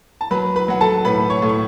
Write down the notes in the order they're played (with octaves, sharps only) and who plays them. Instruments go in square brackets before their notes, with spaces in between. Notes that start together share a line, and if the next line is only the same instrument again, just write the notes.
[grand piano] A5
F#3 B4 B5
B4 B5
F#3 F#5
A4 A5
A2 B4 B5
C#5 C#6
A2
C#6